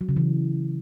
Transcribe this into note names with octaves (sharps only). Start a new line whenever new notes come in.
F#3
C#3
E3